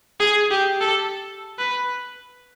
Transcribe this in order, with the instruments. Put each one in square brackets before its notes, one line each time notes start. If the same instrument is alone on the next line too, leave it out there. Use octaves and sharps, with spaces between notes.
[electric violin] G#4
G4
A4
B4